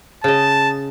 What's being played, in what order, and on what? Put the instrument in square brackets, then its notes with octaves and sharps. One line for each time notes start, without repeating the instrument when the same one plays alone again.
[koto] C#3 D#5 [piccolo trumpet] A5